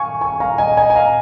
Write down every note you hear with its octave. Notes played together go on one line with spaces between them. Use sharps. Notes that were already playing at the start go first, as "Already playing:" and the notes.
Already playing: F5 G#5 C#6
G#5 C#6
F5 A#5
D#5 G#5
D#5 G#5
G#5
F5 A#5